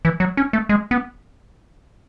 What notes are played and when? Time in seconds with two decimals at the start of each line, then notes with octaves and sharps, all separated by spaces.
0.05 E3
0.20 F#3
0.37 C#4
0.53 A3
0.69 G#3
0.91 B3